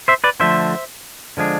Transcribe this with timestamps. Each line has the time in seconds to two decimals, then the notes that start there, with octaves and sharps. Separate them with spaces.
0.08 C5 E5
0.24 B4 D5
0.40 D3 F3 A3 C5 E5
1.37 D3 F3 G#3 D4